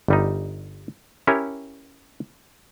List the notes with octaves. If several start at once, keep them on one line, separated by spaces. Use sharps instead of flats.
G1 G3 D#4
C#4 E4 G4 A#4 C#5